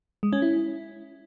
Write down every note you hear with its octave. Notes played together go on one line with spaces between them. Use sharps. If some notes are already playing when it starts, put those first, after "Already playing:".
G#3
C#4
E4